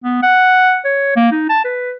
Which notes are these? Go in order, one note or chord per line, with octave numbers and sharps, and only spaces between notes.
B3
F#5
C#5
A#3
D#4
A5
B4